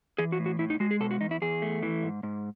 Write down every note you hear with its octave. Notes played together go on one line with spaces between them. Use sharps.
E3 G#4
F#4
A2
F#4
A2 E4
D#4
G#3 F#4
G#4
B2 A4
F#4
E2 D#4
E4
E2 G#4
A3
E3
G#2
G#2